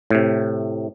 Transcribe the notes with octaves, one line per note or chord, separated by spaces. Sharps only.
A2 C3